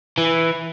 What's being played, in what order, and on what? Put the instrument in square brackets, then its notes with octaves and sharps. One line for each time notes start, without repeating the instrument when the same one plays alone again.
[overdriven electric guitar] E3